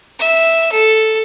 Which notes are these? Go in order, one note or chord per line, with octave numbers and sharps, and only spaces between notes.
E5
A4